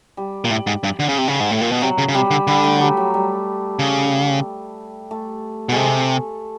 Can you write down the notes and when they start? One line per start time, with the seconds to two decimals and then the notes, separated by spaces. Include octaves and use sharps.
0.17 G3
0.45 A#2
0.51 A2
0.67 G#2
0.84 G2
0.99 D3
1.09 C#3
1.18 C3
1.28 C#3
1.40 G#2
1.51 A2
1.61 A#2
1.72 B2
1.81 C3 F#3
1.98 C#3
2.09 C#3
2.15 C3 G3
2.31 D3
2.47 D3 G3
2.64 A3
2.76 F#3
2.81 G3
2.97 F#3
3.14 G3
3.79 C#3
5.11 A3
5.69 B2
5.72 C3 G#3 A3